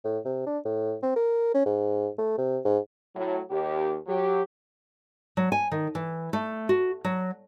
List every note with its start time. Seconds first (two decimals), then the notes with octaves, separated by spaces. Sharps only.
0.05 A2
0.25 C3
0.46 D4
0.65 A2
1.02 C4
1.16 A#4
1.54 C#4
1.66 G#2
2.18 A3
2.38 C3
2.65 G#2
3.15 A2 F#3
3.50 D#2 G4
4.07 F#3 G4
5.37 F#3
5.52 G#5
5.72 D#3
5.95 E3
6.33 A3
6.69 F#4
7.04 F#3